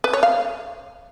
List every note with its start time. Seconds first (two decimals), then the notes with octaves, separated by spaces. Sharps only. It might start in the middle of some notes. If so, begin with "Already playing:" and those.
0.04 B4
0.13 C#5
0.23 F5